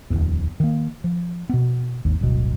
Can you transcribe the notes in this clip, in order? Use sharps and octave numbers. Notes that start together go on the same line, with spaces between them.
D1 G1 E2
D#3 A#3
F3
B2 B3
G#1 D#2
D1 G1 B2